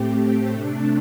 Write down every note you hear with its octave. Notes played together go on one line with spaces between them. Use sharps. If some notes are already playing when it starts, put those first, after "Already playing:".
Already playing: A2 A3 C4 G4
C3 A3 D4